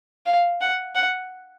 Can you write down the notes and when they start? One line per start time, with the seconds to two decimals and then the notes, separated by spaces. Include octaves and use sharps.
0.26 F5
0.61 F#5
0.95 F#5